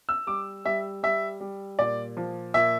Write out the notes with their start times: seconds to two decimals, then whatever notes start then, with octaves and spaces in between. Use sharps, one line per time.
0.09 E6
0.27 G3 D6
0.65 G3 E5
1.03 G3 E5
1.40 G3
1.79 A#2 D5
2.17 F3
2.54 A#2 E5